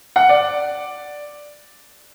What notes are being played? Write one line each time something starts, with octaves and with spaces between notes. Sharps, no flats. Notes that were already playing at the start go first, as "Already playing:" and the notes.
F#5
D5